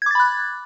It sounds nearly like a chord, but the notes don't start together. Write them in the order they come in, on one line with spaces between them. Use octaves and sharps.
G#6 D6 A6 B5 F#6